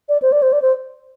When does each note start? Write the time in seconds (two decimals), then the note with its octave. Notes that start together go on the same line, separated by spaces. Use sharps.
0.08 D5
0.22 C5
0.32 D5
0.42 C5
0.52 D5
0.61 C5